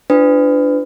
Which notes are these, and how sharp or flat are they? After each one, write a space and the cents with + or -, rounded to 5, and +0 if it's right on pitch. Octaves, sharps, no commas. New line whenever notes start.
D4 +0 F4 -35 B4 +35